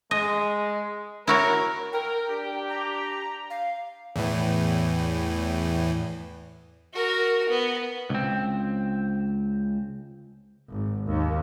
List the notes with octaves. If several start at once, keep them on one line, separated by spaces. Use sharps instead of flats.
G#3 D#5
E4 F#4 A#4 C#5
A#4 G5
D4 G4
A#5
F5
E2 A2 E3
F#4 A#4
B3
C#2 C4
G#1
D#2